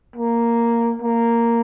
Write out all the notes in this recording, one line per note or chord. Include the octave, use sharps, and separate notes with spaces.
A#3
A#3